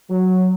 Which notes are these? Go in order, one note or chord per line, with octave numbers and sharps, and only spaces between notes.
F#3